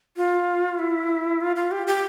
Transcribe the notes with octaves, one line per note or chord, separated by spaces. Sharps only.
F4
E4
F4
F4
G4
G4